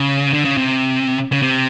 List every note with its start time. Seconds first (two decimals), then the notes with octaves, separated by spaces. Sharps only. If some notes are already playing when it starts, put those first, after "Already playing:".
Already playing: C#3
0.34 D3
0.45 C#3
0.57 C3
1.32 C#3
1.42 C3